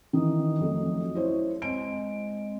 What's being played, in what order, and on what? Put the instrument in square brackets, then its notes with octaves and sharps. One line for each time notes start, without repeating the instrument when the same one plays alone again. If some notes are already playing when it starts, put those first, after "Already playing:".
[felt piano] D#3 E3 [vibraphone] D#5 D#6
[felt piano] F2 F#3 A3
E4 C5 C#5
[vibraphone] G#3 C4 D#5 [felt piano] D7